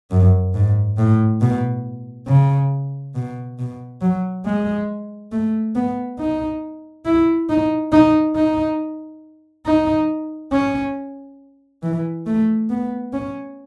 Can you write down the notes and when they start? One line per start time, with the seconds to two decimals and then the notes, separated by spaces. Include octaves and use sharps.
0.11 F#2
0.54 G#2
0.98 A2
1.41 B2
2.28 C#3
3.15 B2
3.59 B2
4.02 F#3
4.45 G#3
5.32 A3
5.76 B3
6.19 D#4
7.06 E4
7.49 D#4
7.93 D#4
8.36 D#4
9.66 D#4
10.53 C#4
11.83 E3
12.27 A3
12.70 B3
13.13 C#4